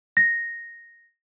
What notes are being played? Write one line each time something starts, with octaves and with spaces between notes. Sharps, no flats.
A#6